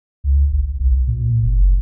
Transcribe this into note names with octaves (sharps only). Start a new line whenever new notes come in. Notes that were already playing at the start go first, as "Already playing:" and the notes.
C#2
G#1
C2
A#2
F#1